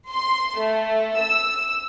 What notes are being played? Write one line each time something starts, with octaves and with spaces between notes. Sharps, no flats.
C6
A3
E6